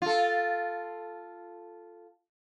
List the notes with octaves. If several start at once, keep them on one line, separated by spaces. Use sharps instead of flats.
F4 A4